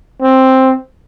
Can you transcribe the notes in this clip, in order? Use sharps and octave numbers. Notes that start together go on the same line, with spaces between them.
C4